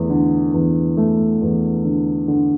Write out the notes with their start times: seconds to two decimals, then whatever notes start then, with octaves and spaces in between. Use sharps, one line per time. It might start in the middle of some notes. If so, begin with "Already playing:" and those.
Already playing: E2 A3
0.10 D3
0.54 E2
0.97 A3
1.42 E2
1.85 D3
2.28 D3